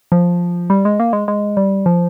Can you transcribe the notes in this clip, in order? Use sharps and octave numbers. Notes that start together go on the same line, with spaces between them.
F3
G3
G#3
A#3
G#3
G#3
G3
F3